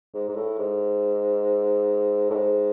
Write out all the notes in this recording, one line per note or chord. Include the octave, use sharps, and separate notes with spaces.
G#2
G#2
A2
G#2
A2
G#2